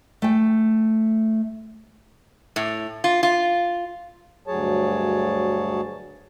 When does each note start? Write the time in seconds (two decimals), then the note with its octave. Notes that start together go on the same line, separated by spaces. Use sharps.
0.22 A3 G5
2.56 A2
3.04 F4
3.23 F4
4.47 D2 G2 F#3 G#4 C#5 A5